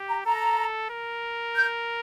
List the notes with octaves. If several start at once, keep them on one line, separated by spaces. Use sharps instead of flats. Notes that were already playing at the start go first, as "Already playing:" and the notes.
Already playing: G4
A#5
A4 A#5
A#4
G6